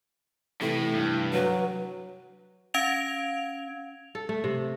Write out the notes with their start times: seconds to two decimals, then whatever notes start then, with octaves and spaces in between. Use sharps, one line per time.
0.61 A2 C3 E3 A3 E4
0.93 G2
1.33 F#3 B4
2.74 C#4 F5 G#6 D7 F7
4.15 A4
4.29 A3
4.44 C3